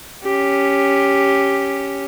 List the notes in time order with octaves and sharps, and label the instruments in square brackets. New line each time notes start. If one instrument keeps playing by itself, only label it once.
[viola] C#4 G4